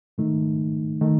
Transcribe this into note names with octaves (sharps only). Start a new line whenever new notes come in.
G#2 D#3 A3 D#4
D#3 A3 D#4